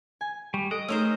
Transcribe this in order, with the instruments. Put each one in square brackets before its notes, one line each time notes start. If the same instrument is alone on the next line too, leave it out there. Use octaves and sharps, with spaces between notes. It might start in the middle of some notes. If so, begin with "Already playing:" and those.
[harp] G#5
[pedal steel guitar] G3 [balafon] C#6
[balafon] A4 [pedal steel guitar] D#5 [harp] D#6 D7
[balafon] A3 D#4 G#4 [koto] C#4 A#4 C5